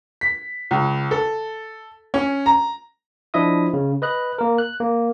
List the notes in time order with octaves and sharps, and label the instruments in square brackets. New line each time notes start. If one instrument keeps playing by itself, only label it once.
[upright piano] B6
C#2
A4
C#4
A#5
[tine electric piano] F3 D4 E4 D#5 E5 D#6
C#3
B4 D#5 F#6
A#3 A#4
F#6
A#3